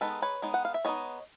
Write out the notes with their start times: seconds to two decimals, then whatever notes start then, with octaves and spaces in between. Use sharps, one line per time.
0.01 G#3 B3 D#4 A4 B4
0.22 B4 C#5
0.42 G#3 B3 D#4
0.54 F#5
0.65 F5
0.74 E5
0.85 G#3 B3 D#4 C#5 D#5